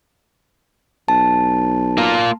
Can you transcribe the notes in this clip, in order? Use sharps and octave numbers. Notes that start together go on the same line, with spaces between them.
B1 A5
A#3 F4